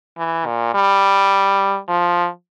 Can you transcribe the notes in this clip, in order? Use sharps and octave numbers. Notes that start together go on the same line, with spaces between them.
E3
A#2
G3
F3